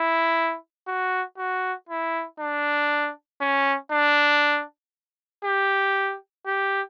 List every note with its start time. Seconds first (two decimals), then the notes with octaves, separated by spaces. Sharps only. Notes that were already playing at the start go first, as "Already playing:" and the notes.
Already playing: E4
0.87 F#4
1.38 F#4
1.89 E4
2.39 D4
3.41 C#4
3.92 D4
5.44 G4
6.46 G4